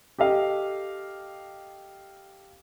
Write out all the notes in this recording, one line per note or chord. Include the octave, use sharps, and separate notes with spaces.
G4 A4 D#5 F5